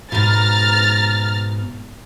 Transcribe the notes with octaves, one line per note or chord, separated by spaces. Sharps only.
G#2 B2 A#5 F6 A6